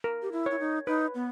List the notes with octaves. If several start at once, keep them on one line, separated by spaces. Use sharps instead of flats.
A#4
G4
E4
E4 C#5
D#4
D#4 B4
B3